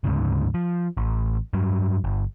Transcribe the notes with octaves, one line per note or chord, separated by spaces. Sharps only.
D2 G#2 C#3
F3
A1
G2 F#3
G1